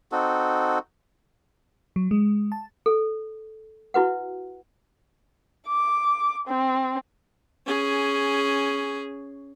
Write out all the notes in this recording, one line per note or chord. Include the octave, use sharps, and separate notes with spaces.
C4 D#4 F#4 A4
F#3
G#3
A5
A4
E4 F#4 B4 F#5
D6
C4
C#4 G#4